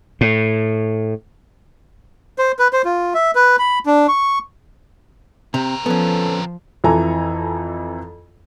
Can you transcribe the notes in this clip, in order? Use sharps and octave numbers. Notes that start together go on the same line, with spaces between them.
A2
C5
B4
C5
F4
E5
B4
B5
D4
C#6
C3 C4 A#4
F3 B3 C#4 A4
F2 E3 A4 G#5 A#5